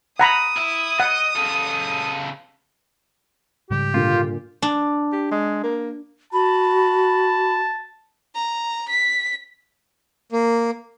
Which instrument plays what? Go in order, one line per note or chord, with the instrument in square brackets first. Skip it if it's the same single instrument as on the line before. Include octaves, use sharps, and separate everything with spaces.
[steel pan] F#5 A#5 B5 [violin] D#6
[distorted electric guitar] E4
[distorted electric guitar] D#5 [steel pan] F#5
[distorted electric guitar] C#3 A4
[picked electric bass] G#2 C#3 G3 [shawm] G4
[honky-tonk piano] A#2 D3 [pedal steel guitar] F4
[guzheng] D4
[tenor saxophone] G4
G#3
A#3
[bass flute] F#4 [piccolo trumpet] A5 [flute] B5
[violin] A#5
B6
[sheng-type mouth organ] A#3